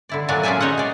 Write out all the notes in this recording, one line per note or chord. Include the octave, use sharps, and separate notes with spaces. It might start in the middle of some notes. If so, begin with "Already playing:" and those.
D3 E4 D5
A#2 F#3 D4 D5 G#5
C#4 F4 G#4 D5 E5 G#5
D#4 C#5 D#5 F#5
G#4 D5